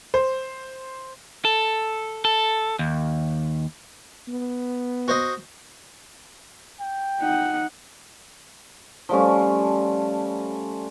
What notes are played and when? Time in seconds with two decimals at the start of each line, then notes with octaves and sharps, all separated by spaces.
0.14 C5
1.45 A4
2.25 A4
2.79 D#2
4.28 B3
5.08 F#4 C5 D#5
6.81 G5
7.20 D#4 F#5
9.09 F3 G3 A3 C#4